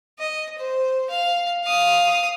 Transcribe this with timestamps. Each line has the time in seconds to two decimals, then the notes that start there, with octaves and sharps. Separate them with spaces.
0.19 D#5
0.58 C5
1.10 F5
1.64 F5 D#6